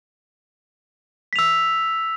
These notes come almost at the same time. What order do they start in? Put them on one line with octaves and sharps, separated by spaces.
B6 F7 E6